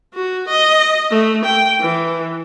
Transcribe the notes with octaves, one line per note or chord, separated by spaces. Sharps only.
F#4
D#5
A3
G5
E3